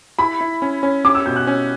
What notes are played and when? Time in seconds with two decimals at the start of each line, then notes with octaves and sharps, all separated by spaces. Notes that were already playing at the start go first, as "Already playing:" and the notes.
0.19 E4 B5
0.41 E4
0.62 C#4
0.83 C#4
1.05 C#4 D6
1.15 E6
1.26 B2 G6
1.36 F#6
1.47 C#4